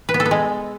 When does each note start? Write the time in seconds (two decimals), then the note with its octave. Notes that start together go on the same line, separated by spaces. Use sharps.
0.09 B4
0.14 B3
0.20 A4
0.25 B3
0.31 G#3